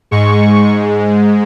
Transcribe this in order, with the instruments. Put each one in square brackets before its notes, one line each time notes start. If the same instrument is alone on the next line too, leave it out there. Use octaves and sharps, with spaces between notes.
[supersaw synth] G#2 G#3 C#6